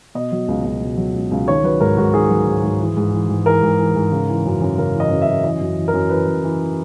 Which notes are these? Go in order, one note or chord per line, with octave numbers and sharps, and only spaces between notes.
B2 D#5
F#3
C#2
C#2
B2
F#3
C#2
C#2
D#3 C#5
F#3 B4
G#2 A#4
G#2 F#4
D#3 G#4
F#3
G#2
G#2
E3
G#2
E3
G#2
E3 A#4
G#2
E3
G#2
C#3
E3
F#2
F#2
C#3 A#4
E3
D#5
F#2
E5
F#2
E3 D#5
F#2
E3
A#4
F#2
E3 B4
F#2
E3